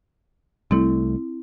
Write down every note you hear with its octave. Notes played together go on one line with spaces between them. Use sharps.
C2 G3 A3 C4 E4